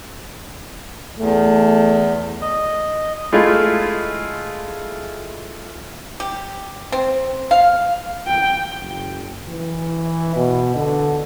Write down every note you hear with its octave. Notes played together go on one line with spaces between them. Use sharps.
E2 A3
D#5
G#3 A3 E4 F4
G4
C4
F5
G5
F#1
E3
B2
D3